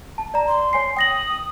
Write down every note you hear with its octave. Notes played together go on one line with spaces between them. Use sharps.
A5
D5 A#5
D5 C6
C#5 G#5 C7
G5 D#6 A#6 F#7